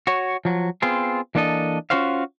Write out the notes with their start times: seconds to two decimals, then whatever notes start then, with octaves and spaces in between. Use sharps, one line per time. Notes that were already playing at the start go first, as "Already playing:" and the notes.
0.07 F#4 C#5
0.45 F3 F#3
0.82 B3 C4 F4 G#4
1.35 E3 A#3 D4 A4 D#5
1.90 C#4 D4 F4 F#4 C5 F5